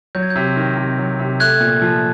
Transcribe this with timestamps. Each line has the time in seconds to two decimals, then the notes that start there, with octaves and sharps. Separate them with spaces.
0.15 F#3 G6
0.23 G#6
0.30 G6
0.36 C3
0.56 D#3
0.77 C3
0.98 F#3
1.19 C3
1.40 A3 F#6 G#6
1.61 A#2
1.82 F3